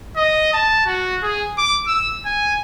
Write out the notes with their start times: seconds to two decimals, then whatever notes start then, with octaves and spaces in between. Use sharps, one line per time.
0.16 D#5
0.53 A5
0.86 F#4
1.22 G#4
1.58 D6
1.87 E6
2.25 G#5